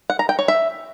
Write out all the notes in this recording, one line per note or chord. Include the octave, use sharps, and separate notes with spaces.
F#5
A#5
G5
C#5
E5